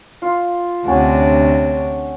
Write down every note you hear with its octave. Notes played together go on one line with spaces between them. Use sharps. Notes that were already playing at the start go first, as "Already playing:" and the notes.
F4
D2 C3 C#4 D4 F#5